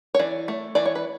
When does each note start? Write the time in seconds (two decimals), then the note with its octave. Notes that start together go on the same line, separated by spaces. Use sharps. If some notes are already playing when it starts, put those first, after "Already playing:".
0.15 C#5
0.19 E3 D5
0.48 A3
0.75 E3 D5
0.86 C#5
0.95 B4